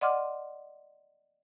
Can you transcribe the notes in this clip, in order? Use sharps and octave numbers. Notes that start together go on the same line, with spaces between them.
D5 D#5 F#5 C6 D6 F6